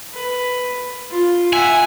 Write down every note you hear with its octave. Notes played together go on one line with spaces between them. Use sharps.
B4
F4
E5 F#5 G#5